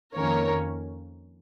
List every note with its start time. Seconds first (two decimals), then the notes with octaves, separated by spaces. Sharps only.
0.15 F2 D#3 A#3 C#4 A#4 C#5